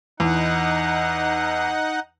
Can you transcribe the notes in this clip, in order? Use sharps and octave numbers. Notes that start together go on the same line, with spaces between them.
E2 D#4 F#5